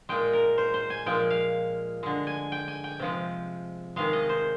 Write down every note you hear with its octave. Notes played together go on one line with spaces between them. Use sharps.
A#2 G#3 G5
A#4
C5
C5
G#5
A#2 F3 G#3 G5
F5
D3 G#3
G#5
G5
G#5
G5
C3 F3 G#3
C3 D#3 G#3 F5
D#5
C5